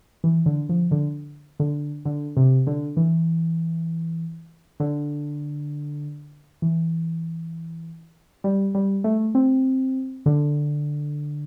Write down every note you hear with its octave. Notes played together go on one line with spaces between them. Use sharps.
E3
D3
F3
D3
D3
D3
C3
D3
E3
D3
E3
G3
G3
A3
C4
D3